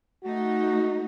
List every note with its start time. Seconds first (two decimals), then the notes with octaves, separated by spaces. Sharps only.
0.24 A3 D#4 F#4